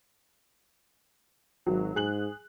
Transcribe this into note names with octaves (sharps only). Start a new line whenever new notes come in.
G#1 F#3
G#2 G#4 F#6 F#7